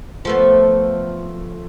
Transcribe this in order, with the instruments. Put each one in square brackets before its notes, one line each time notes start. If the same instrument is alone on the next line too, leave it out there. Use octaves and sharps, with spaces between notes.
[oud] F3 A3 B3